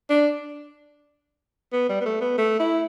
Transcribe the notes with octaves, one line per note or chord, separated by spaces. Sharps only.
D4
B3
G3
B3
A3
B3
A3
E4